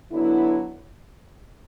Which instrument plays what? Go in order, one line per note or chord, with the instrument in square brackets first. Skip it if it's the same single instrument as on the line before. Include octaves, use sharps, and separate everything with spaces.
[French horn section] D3 F#3 B3 E4